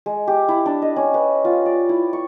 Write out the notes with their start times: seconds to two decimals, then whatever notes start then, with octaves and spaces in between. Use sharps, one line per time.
0.06 G#3
0.27 G4
0.48 E4
0.66 D4
0.82 D#5
0.96 C#4
1.14 B4
1.45 F4
1.66 D5
1.89 E4
2.13 C#6